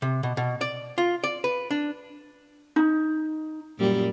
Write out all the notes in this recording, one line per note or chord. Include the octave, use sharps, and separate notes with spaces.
C3
B2
B2
D5
F4
D5
B4
D4
D#4
F#2 A#2 G3